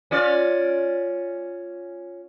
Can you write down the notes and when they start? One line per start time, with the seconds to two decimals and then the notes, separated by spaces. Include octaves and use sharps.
0.11 C#4 F4 D5